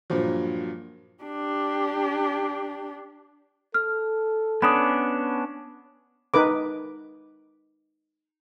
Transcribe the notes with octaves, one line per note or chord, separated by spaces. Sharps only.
G2 A#2 F3 F#3
D4 G4
A4 F6
B3 C#4 D4 B5 D#6
D#4 A#4 B4 D6